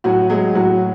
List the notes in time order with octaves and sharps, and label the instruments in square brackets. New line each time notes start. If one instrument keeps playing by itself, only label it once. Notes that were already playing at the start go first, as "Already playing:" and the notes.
[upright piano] A2 F#3 F#4
F#3 G#3 G#4
A2 F#3 F#4